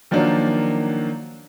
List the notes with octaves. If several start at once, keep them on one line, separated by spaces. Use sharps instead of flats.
D#3 F3 F#3 A#3 D4